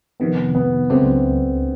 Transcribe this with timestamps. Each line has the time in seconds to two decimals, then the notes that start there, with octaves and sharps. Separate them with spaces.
0.20 F2 C3 D#3 B3
0.55 B3
0.90 C#2 C#3 F#3 A3 C4 D4